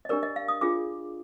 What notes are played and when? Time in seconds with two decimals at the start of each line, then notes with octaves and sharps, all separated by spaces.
0.05 D#5
0.09 D4 G4 A#4 D5
0.23 D#5
0.36 F5
0.48 D#6
0.61 D4 F4 G#4 D6